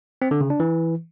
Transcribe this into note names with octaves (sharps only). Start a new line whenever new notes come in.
C4
D3
C#3
D4
E3